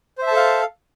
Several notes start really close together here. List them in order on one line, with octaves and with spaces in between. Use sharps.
C5 E5 A5 A4 F5